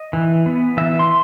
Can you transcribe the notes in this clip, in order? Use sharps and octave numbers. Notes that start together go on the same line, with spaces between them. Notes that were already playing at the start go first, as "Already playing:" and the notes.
Already playing: D#5
E3
B3
E3 E5
C6